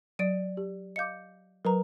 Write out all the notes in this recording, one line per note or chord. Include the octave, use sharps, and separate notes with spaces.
F#3 D5 D7 D#7
G4
D#5 F5 D6 G6 C#7
F#3 A#4 B4 A#5